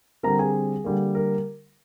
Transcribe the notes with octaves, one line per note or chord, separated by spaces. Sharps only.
D3 G3 C4 A#4 A#5
G#4 G#5
D3 G3 A#3
A#4